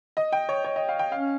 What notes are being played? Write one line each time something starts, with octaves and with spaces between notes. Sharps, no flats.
D#5
G5
C#5
C#5
D#5
F5
G5
C#4 F5